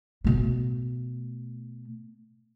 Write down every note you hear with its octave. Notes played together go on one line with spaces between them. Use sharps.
B2 A3